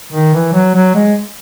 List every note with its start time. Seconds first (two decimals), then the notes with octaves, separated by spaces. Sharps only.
0.12 D#3
0.34 E3
0.53 F#3
0.75 F#3
0.95 G#3